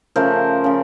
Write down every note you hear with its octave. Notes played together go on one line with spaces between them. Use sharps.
C#3 F3 A3 A#4 C5
C#3 F3